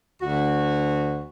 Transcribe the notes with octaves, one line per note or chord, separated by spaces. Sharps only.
D2 F#4